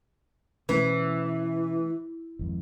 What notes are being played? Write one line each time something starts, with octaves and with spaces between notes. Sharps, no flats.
B2 E3 A3 C#4
G#1 F2